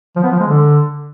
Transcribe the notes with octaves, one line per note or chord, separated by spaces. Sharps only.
F3
B3
F3
G#3
D3